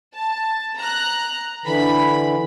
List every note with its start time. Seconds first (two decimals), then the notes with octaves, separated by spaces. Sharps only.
0.14 A5
0.77 A#5 F#6
1.66 D3 E3 B5